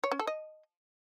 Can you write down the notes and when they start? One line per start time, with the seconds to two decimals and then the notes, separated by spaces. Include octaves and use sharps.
0.04 C#5
0.12 C#4
0.19 A4
0.27 D#5